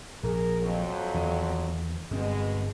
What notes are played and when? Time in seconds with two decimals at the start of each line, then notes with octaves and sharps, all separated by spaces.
0.23 A#1 G#4 A#4
0.62 F2 F#3
1.14 E2 D#3
2.11 G1 G2 B2 G#3 C4